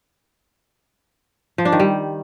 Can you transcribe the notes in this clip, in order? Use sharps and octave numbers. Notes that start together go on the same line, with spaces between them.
F3
D4
D#3
G3